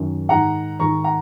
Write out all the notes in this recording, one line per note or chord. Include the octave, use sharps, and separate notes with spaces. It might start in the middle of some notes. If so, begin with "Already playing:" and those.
Already playing: F#2 D#3
G#2 D#3 F#5 A#5
G#2 D#3 A#5 C#6
F#5 A#5